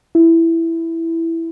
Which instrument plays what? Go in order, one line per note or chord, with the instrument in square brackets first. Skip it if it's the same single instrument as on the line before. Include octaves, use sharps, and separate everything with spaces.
[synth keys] E4